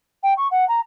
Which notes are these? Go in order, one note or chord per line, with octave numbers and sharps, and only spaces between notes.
G5
C#6
F#5
A#5